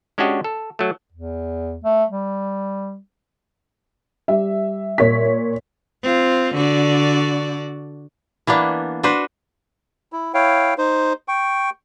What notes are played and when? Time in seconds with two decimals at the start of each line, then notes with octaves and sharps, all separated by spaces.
0.18 G#3 C#4 D4 F#4 G4 D#5
0.44 A4
0.79 F#3 A3
1.12 E2
1.84 A3
2.10 G3
4.28 G3 E5
4.98 A#2 C#5 B6
6.03 C4 F4
6.55 D3 F#4 D5
8.47 E3 A#3 B3 D4
9.03 D4 F#4 B4 C5
10.12 E4
10.34 E4 C#5 F5 G5
10.78 D#4 C5
11.28 G5 C#6